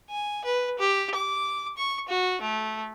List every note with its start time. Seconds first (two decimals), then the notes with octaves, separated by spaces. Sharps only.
0.10 G#5
0.44 B4
0.79 G4
1.15 D6
1.78 C#6
2.09 F#4
2.41 A3